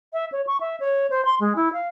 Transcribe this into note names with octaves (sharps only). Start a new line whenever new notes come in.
E5
C#5
C#6
E5
C#5
C5
C6
G#3
E4
F5